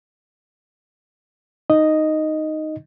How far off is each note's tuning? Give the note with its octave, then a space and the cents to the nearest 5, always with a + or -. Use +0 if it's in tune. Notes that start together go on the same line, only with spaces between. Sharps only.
D#4 +0 D#5 +0